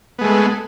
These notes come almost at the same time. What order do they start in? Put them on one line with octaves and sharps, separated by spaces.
B3 G#3 A3